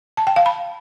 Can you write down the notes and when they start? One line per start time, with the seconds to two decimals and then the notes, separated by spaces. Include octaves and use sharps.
0.17 A5
0.27 G5
0.36 F5
0.46 B5